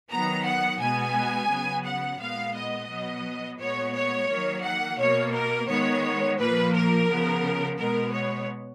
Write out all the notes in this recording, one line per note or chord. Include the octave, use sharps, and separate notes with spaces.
D#3 F#3 B3 A#5
F#5
B2 G#3 B3 G#5
C#3 F#3 B3
F#5
A#2 G#3 B3 F5
D#5
B2 F#3 B3
A#2 G#3 B3 C#5
C#5
D#3 F#3 A#3
F#5
B2 A#3 C#5
A#4
D#3 G#3 B3 C#5
A#2 F3 A#3 B4
A#4
C#3 F3 B3
B2 G#3 B3 A#4
C#5